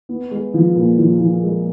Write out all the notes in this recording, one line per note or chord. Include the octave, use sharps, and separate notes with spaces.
B3
G#3
F3
A#2
F3
F3
G#3